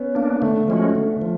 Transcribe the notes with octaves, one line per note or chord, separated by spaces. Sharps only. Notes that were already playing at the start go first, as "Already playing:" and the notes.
Already playing: B3 C#4
A#3 D4
D3 A3
F3 G#3 C#4 F#4
D3
F3